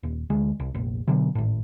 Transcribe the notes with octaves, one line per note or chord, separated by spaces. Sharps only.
D#1
D2 G#3
C2
F1 A#1
B2 D3 E3 F#3
G#1 A2